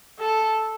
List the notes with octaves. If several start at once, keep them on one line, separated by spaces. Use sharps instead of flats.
A4